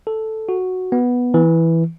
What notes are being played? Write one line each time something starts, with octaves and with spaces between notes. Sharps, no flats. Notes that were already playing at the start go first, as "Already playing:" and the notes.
A4
F#4
B3
E3